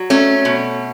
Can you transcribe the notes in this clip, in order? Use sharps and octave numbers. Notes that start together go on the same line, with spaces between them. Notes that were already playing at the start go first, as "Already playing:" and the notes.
Already playing: F#3
A3 C#4
B2